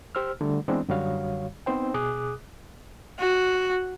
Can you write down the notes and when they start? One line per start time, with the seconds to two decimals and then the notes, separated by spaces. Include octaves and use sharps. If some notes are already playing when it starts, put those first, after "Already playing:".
0.15 G4 C5 E6 F6
0.41 D3 G3 A3
0.68 E3 G#3 B3 C4 D4
0.89 F#2 D3 G3 F#4 C#5 F5
1.66 B3 C4 D#4 C5 G5
1.94 B2 G#4 D6 D#6 F#6
3.19 F#4